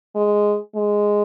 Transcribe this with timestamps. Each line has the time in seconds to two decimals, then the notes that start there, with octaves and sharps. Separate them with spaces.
0.16 G#3
0.76 G#3